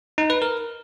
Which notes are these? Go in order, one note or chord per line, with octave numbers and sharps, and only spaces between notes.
D#4
B4
A#4